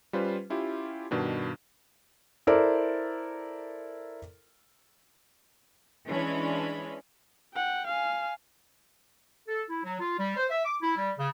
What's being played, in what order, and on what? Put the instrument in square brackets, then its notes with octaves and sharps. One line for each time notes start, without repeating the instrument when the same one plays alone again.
[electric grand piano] G3 C#4 F4 B4 C5
C#4 E4 F4 G4
G2 B2 D#3 D4
[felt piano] E4 A4 A#4 C5 D5
[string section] E3 G#3 C#4 D4 B5
[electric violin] F#5 G5
F5 G#5
[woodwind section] A4
E4
F#3
F4
G3
C5
E5
D6
E4
G3
C#3